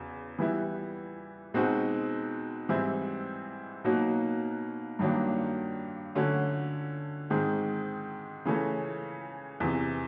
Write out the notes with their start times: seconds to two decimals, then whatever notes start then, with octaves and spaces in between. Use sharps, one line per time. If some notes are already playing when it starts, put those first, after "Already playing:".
Already playing: E2 C#3 F#3
0.38 E3 G3 B3 E4
1.54 B2 G#3 C4 D#4 F#4
2.69 G#2 E3 G3 C4 E4
3.84 B2 F#3 A#3 D#4 F#4
4.99 G2 D#3 F#3 A#3 D4
6.15 D3 F#3 A3 C#4 F#4
7.30 G#2 D#3 G#3 C4
8.45 C#3 E3 A3 C#4
9.60 E2 C3 E3